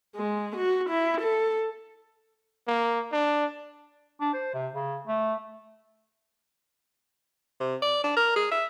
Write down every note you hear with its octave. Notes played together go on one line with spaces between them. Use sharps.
G#3
F#4
E4
A4
A#3
D4
D4
C5
C3
C#3
A3
C3
D5
D4
A#4
G#4
E5